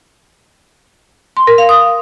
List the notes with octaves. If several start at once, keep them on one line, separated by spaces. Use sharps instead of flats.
C6
A#4
F5
D#6